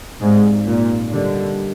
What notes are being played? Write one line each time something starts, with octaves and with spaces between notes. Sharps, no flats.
G#2 C4 D#4 G4 D5 F5
A#2
D3 G3 D4 G4 A#4 D#5